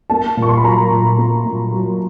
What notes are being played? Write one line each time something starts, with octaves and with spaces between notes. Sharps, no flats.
A#3 A5
A#2
C#6
C6
B5
F#3 A#5
A#2
A#3
A#2
F#3